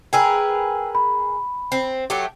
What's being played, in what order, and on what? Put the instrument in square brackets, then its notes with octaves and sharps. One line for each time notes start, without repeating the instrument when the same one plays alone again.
[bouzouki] G#4 A#4 B4 [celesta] G5 E6
[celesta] B5
[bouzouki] C4
F#3 A3 G4